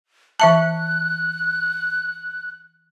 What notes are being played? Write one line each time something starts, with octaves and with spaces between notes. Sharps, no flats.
E3 E5 A5 F#6